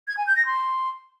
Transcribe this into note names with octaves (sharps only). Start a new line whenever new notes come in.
G#6
G#5
G6
A#6
C6